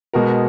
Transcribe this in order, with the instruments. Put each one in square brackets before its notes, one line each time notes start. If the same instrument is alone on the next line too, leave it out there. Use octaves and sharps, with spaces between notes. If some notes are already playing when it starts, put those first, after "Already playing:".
[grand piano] B2 G#3 B3 F#4 A#4